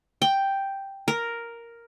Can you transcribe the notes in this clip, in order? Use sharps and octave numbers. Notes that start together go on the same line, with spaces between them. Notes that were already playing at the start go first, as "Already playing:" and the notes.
G5
A#4